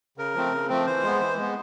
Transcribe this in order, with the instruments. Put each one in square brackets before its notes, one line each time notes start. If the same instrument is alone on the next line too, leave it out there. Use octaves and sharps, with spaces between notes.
[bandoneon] C#3 A#4
F3 A3 C4
C#3
F3 A3 C4
E3 C5
G#3 B3
E3
G#3 B3